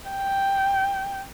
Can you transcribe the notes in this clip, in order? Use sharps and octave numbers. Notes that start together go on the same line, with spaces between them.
G5